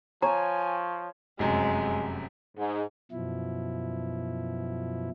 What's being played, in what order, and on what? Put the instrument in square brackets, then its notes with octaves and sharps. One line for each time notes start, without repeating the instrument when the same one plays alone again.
[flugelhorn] F3 [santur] C#5 [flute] G#5 [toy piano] A#5
[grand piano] F1 F#2 C3 [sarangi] G#3
[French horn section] G#2
[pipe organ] F#2 B2 F3 E4